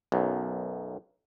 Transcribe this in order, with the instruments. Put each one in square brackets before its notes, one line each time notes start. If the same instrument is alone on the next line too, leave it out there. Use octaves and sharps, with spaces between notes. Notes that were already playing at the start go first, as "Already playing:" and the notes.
[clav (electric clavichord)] B1 F#2